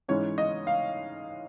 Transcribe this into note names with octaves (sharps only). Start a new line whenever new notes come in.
G#2 E3 G#3 C#4 C#5
D#5
F5